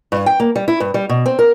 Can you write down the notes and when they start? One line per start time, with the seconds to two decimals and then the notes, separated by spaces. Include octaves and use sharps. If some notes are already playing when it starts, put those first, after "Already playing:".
0.12 G2
0.26 G5
0.40 A#3
0.56 G3
0.68 E4
0.80 G2
0.94 G3
1.09 B2
1.26 C4
1.39 A#4